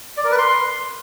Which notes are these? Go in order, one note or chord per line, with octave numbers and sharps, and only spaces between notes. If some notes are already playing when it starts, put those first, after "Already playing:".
D5
A#4
B4
C6